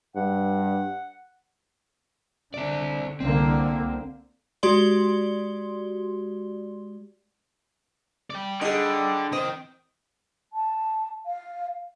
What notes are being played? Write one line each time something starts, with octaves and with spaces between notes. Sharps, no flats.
G2 F#5
D3 C4 D5
C2 D3 A#3 C4
G#3 F#4 G4 D5 C6 G7
D5 G5
D3 D#4 G#4
C4 D#5 G5
A5
F5